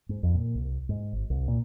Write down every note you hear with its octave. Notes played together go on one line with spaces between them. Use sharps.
G#2
F2
A#2
C2
G#2
G#1
C2
A#2